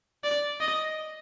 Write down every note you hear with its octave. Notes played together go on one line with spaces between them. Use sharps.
D5
D#5